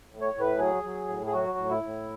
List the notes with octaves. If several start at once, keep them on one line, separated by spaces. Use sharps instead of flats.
A2
C#5
A2
B4
F#3 G#4
F#3
A2
G#4
F#3 F#4
A2
E4
A2